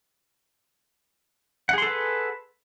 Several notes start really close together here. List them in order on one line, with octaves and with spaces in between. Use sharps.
F#5 G#4 C6 A4 B4